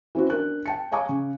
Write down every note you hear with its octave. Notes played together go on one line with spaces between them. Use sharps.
E3 C4 C#4 F#4
D4 A#4 F#6
G5 A5 C#7
C#5 F5 G#5 A#5 C#6 D6
C#3